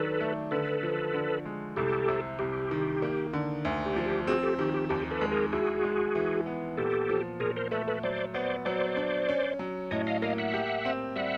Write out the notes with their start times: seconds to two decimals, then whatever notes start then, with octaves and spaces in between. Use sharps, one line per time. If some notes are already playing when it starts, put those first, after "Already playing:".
Already playing: D#3 F#3 D4 A4 B4
0.21 A3
0.51 D3 A4 B4
0.83 F3
1.14 D3
1.45 G#3
1.77 C2 G4 A4
2.08 C3
2.39 C2 G4
2.71 D#3
3.02 A#3
3.33 D3
3.65 D2
3.86 G4
3.96 F3
4.06 G4
4.27 C4 F#4 G#4
4.43 G4 A4
4.59 D#3 G4
4.74 G4
4.89 D#2 G4
5.11 A4 B4
5.21 G#3
5.31 G#4 A#4
5.53 E4 F#4 G#4
5.84 G#3
6.15 E3
6.46 B3
6.77 A#2 G4 A4
7.09 F3
7.40 A#2 G#4 A#4
7.56 A#4 C5
7.71 A3 A4 B4
7.87 A4 B4
8.03 F#3 C5 D5
8.34 B3 C5 D5
8.65 F#3 C5 D5
8.97 D4
9.29 C#4
9.59 F#3
9.91 A2 C#5 D#5
10.07 D#5 F5
10.22 A#3 D#5 F5
10.38 E5 F#5
10.54 G4
10.85 C4
11.16 G3 E5 F#5